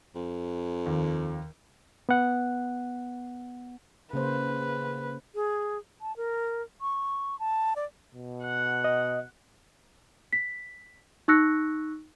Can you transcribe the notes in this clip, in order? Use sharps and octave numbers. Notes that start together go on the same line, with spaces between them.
F2
D#2
B3 F#5
C#3 A#3 B4 C5
G#4
A5
A#4
C#6
A5
D5
B2
F#5
D#5
B6
D#4 C#6 E6 F#6 A#6 C#7